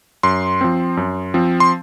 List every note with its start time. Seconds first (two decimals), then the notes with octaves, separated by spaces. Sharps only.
0.23 F#2 C6
0.61 F3 C4
0.97 F#2
1.34 F3 C4
1.60 C6